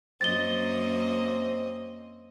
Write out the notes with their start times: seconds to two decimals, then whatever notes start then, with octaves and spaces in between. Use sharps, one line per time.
0.21 F#2 A#3 C4 D#5 A6 G7